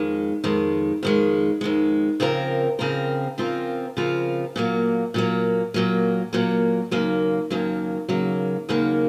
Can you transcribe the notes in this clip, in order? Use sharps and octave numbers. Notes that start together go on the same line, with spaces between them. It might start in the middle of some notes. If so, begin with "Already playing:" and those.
Already playing: F2 D#3 G#3
F2 D#3 G#3
F2 D#3 G#3
F2 D#3 G#3
C#3 F3 C4 F4 A#4
C#3 F3 C4 F4 A#4
C#3 F3 C4 F4 A#4
C#3 F3 C4 F4 A#4
A#2 F#3 A#3
A#2 F#3 A#3
A#2 F#3 A#3
A#2 F#3 A#3
D#2 C#3 F#3 A#3
D#2 C#3 F#3 A#3
D#2 C#3 F#3 A#3
D#2 C#3 F#3 A#3